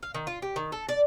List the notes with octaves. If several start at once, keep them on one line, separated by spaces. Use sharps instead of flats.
F5
D#3
F4
G4
D#3
A4
D5